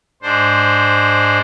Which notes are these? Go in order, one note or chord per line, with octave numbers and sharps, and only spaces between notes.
G#2 D4 C5